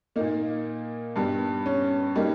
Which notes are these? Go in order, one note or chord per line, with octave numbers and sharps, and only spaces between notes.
A#2 A#3 D#4
G2 G3 B3
C#4
G3 A#3 D#4